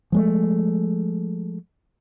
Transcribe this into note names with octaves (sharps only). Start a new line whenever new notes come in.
F3 G#3 A3